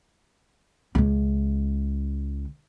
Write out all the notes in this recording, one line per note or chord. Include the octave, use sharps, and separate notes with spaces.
C#2 C#3